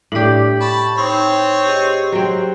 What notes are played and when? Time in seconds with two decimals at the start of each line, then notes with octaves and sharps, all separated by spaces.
0.12 A2 D4 G4 D5
0.61 A5 B5 C#6
0.98 C4 D#4 C#5
1.66 G4 G#4 D#5
2.12 F#3 C4